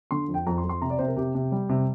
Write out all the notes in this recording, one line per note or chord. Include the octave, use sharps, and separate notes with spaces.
D3 C6
F2
G5
F2 A#5
C6
F2
C6
C3 A#5
D5
C3 C5
A#4
C3 G4
C3
G3
C3